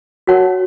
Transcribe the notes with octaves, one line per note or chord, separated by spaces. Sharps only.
F#4 A#4 C#5 F#5 A5